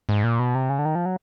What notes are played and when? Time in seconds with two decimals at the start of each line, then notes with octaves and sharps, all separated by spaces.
0.09 G#2
0.24 A#2
0.39 B2
0.55 C3
0.69 C#3
0.79 D3
0.85 D#3
0.95 F3
1.06 F#3